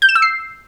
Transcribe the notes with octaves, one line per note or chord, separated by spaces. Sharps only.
G6
E7
E6
C7